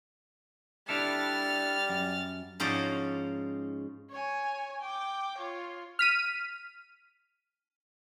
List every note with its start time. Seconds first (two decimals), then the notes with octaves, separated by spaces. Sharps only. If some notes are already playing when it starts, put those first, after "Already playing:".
0.89 G3 D4 E4 A4 F6 A6
1.89 F#2
2.60 G#2 F3 C#4 D#4 F#4 D5
4.10 C#5 G#5
4.82 G5 D6
5.38 F4 C#5
5.99 F6 B6 D#7